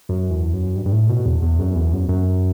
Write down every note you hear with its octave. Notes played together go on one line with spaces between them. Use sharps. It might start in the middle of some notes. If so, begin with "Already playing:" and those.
F#2
E2
F#2
G2
G2
A2
B2
E2
E2
F#2
E2
F#2
F#2